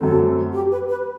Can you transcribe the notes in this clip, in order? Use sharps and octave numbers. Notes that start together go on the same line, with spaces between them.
F#2 F#3 A3 C4 A4
G4
B4
B4